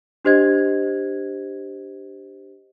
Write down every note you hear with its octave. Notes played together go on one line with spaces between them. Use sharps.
D4 G4 C5 D#5 G#6